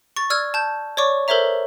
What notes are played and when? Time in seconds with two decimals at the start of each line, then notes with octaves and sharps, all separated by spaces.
0.17 C#6 A6
0.30 D5 E6 F6 G#6
0.54 A5 G6
0.97 C#5 D5 C#6 D6
1.28 A4 A#4 C5 C#5 E5 A#5